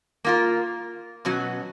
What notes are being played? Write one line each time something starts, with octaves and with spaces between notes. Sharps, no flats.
A#3 F4 A#4
B2 F#3 C#4 F#4